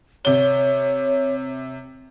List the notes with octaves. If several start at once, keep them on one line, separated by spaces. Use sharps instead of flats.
C3 C#5 G7